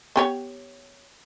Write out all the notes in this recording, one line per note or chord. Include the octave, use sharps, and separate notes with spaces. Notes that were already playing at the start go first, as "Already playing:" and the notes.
B3 G4 C#5